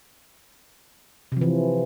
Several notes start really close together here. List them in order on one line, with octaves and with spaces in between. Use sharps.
C3 F3 E3